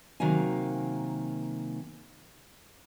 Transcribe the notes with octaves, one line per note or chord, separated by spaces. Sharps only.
C3 D#3 F#3 A#3 F5 G#5